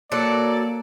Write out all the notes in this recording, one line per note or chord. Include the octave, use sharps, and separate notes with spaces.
F#3 A#3 A4 D5